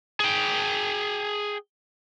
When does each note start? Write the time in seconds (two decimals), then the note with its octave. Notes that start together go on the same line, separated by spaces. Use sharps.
0.20 G#4 G5